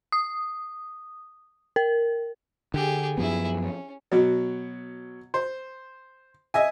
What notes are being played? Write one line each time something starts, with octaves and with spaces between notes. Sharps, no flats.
D#6
A#4
D3 G4 G#4
F#2 F3 B3 E4 G#4
C#4
B2 F#3
C5
D#5 E5 G#5